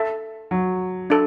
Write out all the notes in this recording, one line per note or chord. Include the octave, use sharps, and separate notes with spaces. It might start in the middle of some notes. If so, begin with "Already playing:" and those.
Already playing: A4 E5 A5
F#3
D4 A4